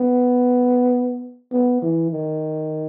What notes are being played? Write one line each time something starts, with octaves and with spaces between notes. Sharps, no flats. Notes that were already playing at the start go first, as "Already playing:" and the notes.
Already playing: B3
B3
E3
D#3